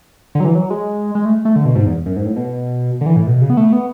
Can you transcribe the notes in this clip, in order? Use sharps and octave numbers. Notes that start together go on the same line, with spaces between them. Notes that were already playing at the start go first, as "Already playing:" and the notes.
D3
F#3
E3
F#3
G#3
G#3
A3
A3
D3
B2
G#2
E2
F#2
G#2
A2
B2
D3
E3
A2
B2
C#3
B3
A3
B3